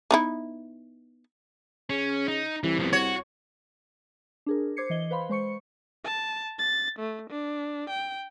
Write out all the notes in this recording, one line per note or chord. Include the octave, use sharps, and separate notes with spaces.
B3 D#4 E4
C#3 C#4
D#4
C2 E3
F3 B3
F#4 C#5
D4 G#4 A#4
C5 D6 G#6 C7 C#7
E3 D#5 G7
B4 C5 F5 B5 C6
G#3 C5 C#6 C#7
A5
A6
A3
D4
G5